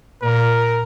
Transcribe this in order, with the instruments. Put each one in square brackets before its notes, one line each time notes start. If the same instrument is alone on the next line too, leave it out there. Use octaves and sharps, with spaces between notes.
[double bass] A#2 [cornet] A#4